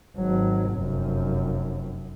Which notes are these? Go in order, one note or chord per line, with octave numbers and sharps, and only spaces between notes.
G#1 F#3
F1 F#2